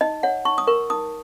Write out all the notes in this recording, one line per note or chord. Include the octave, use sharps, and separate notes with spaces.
D#4 D#5
C#5 F#5
D#4 C#6
D#6
A#4 C#6
D#4 D#6